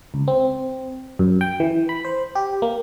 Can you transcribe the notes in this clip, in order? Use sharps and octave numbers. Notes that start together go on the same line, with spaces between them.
C#2
C4
F#2
G5
E3
B5
C5
G4
A#3